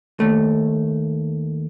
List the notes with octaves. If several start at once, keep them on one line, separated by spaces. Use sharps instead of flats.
D#2 A3